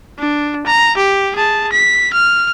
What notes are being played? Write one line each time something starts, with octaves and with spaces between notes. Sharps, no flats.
D4
A#5
G4
G#4 A5
B6
F6